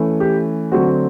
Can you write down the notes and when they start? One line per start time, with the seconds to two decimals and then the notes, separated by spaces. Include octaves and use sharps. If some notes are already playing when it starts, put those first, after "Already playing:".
Already playing: E3 A3 C#4
0.20 G4
0.72 D3 F#3 A3 C4 F#4